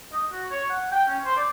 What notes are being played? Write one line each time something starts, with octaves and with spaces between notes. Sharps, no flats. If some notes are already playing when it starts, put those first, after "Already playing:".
D#5
F#4
C#5
F#5
G5
C#4
C5
D5